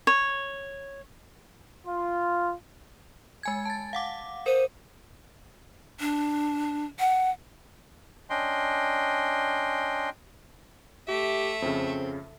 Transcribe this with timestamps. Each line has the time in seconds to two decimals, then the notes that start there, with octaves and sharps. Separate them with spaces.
0.07 C#5
1.87 F4
3.43 G#3 G#5 G#6
3.65 A5 A6
3.93 F5 F#5 D6
4.46 A#4 C5 D#7
6.00 D4
6.99 F#5
8.30 C#4 D4 D#5 G5 C6
11.09 A3 G4 E5
11.62 F2 C#3 C4